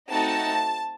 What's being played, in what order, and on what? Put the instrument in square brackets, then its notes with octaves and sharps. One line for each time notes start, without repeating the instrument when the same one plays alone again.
[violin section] A3 C4 D#4 F#4 A5